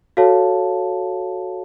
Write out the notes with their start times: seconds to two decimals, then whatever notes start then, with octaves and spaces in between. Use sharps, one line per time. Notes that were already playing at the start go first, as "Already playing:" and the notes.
0.17 F#4 A4 C#5 F5 A5